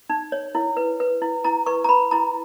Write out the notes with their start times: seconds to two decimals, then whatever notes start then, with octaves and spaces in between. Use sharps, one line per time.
0.10 D#4
0.32 C#5
0.55 E4
0.77 B4
1.00 B4
1.22 E4
1.44 E4 A#5
1.66 B4 C#6
1.84 A#5
1.89 B4 B5
2.11 E4 A#5